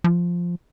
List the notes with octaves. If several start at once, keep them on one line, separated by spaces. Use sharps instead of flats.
F3